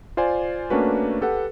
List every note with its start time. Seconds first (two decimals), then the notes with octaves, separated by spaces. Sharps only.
0.17 F4 C5 D5 G#5
0.70 A3 A#3 C#4 D4 F#4 B4
1.21 G4 A4 B4 F#5